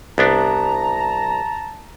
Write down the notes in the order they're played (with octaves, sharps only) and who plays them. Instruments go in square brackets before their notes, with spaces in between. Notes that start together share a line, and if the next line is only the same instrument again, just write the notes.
[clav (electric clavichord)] C2 B3 D4 [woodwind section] A5 A#5